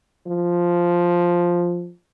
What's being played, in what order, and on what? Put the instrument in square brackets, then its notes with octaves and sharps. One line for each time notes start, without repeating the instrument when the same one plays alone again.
[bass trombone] F3